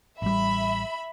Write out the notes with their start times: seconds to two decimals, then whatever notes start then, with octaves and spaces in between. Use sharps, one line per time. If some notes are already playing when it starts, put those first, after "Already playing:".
0.22 A1 G3 E5 B5